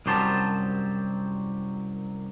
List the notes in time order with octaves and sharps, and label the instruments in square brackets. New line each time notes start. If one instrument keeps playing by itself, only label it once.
[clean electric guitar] C2 F#2 F#3 G4 C5 A5